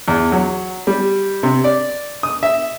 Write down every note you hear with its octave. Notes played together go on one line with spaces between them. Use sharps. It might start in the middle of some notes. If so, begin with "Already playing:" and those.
E2
F#3
G3
C3
D5
D#6
E5